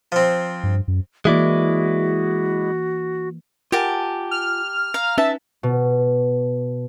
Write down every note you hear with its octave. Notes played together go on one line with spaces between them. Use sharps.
F3 C4
G2
F#2
E3 G#3 A#3 E4 F#4 D5
F4 G4 A#4 F#5 G#5 A5
F6
F5 A#5
C#4 D#4 B4 E5 A5
B2